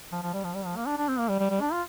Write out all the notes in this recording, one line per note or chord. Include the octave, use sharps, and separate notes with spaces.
F3
F3
G3
F3
G3
F3
A#3
D4
D4
C4
A#3
G3
G3
G3
D4
F4